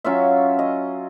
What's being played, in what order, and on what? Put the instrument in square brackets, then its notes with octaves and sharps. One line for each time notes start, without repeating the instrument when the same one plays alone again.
[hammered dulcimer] F#3 C#4 F4 E5
D#5